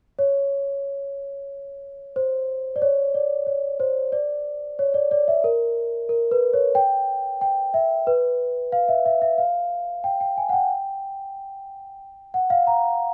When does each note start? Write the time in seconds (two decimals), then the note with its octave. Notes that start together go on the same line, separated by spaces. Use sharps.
0.19 C#5
2.16 C5
2.76 D5
2.82 C#5
3.15 D5
3.46 C#5
3.80 C5
4.12 D5
4.79 C#5
4.94 D5
5.11 D5
5.28 E5
5.44 A#4
6.09 A#4
6.31 B4
6.53 C#5
6.75 G5
7.41 G5
7.74 E5
8.07 B4
8.72 F5
8.89 E5
9.06 E5
9.22 E5
9.38 F5
10.04 G5
10.21 G5
10.37 G#5
10.49 F#5
10.53 G5
12.34 F#5
12.50 F5
12.67 A#5